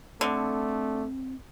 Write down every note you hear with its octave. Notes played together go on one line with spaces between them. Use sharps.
D3 A3 C4